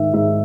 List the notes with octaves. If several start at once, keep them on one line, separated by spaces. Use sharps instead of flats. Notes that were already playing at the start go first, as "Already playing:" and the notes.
Already playing: G#2 D#3 E5
G#2 E5